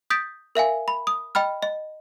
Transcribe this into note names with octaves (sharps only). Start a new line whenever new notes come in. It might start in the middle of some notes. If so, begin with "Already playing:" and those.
D#6 G6 A6 B6 D7
A#4 E5 F5 G#5
B5
D#6
D#5 G5 B5 F6
D#5